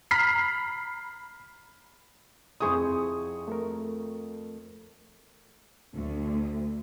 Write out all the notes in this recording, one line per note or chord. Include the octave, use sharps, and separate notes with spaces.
A#5 B5 F6 B6 C7
F2 E4 G#4 C5 C#6 D#6
A3 A4 A#4
D2